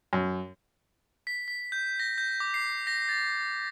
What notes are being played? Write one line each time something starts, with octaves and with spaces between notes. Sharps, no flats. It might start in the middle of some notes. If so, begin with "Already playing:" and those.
F#2
B6
B6
G6
A#6
G6
D6
C7
A#6
A6